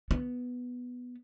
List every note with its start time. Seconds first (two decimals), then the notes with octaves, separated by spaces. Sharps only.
0.11 B3